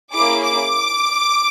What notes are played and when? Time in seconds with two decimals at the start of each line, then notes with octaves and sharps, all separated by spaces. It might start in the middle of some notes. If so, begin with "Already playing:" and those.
0.13 A#3 C#4 E4 G#4 D6
0.44 D6